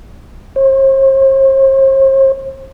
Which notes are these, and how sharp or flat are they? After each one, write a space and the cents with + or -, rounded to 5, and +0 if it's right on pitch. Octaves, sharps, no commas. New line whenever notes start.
C5 +45